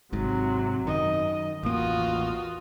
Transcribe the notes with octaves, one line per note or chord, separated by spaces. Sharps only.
G#1 G#2 C3 F#3
F#2 D#3 D#5
A1 E2 A#3 F4 F#4 D#6